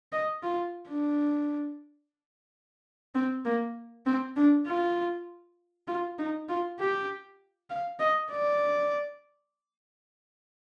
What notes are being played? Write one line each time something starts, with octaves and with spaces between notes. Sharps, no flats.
D#5
F4
D4
C4
A#3
C4
D4
F4
F4
D#4
F4
G4
F5
D#5
D5